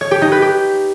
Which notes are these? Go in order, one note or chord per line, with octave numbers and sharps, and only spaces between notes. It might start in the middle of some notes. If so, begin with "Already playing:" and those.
C#5
G4
D#4
B4
G4